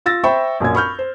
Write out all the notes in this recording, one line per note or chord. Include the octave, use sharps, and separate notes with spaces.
F4 E6 A6 A#6
C5 E5 G5 B5 C#6
A#1 F#2 C#4 G#6
B5 C#6 F6 G6
C5